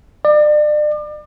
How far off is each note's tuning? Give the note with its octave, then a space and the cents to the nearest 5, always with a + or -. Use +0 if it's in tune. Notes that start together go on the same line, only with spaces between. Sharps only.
D5 +35